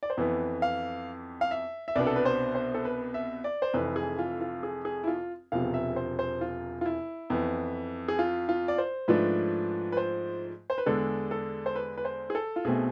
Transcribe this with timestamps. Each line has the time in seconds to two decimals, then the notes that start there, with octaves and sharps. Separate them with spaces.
0.03 D5
0.10 C5
0.17 F2 E3 B3 B4
0.62 F5
1.41 F5
1.51 E5
1.88 E5
1.95 C2 B2 B3 D4 D5
2.07 A4
2.16 B4
2.25 C5
2.55 C5
2.74 A4
2.85 B4
3.14 E5
3.44 D5
3.62 C5
3.73 F1 F2 E3 B4
3.96 G#4
4.19 F4
4.41 F4
4.63 G#4
4.85 G#4
5.04 E4
5.07 F4
5.52 E1 E2 C3 F3 F5
5.74 E5
5.96 C5
6.19 C5
6.41 F4
6.81 F4
6.85 E4
7.30 F2 E3 B3
8.08 G#4
8.19 F4
8.49 F4
8.68 D5
8.78 C5
9.08 G#2 F3 A3 D4 B4
9.92 B4
9.97 C5
10.70 C5
10.78 B4
10.86 E2 D3 G#3 D4 A4
11.31 A4
11.66 C5
11.76 B4
11.98 B4
12.05 C5
12.30 G#4
12.35 A4
12.56 F4
12.65 B1 B2 A3 C4 G#4